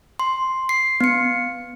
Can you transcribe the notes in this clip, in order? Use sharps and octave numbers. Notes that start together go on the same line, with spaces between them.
C6
C7
B3 C#7